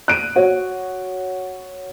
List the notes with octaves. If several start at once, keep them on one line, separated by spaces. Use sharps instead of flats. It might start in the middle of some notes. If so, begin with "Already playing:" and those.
F#6 D7 D#7
F#4 C#5